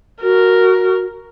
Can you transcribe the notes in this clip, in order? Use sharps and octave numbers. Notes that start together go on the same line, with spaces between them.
F#4 A#4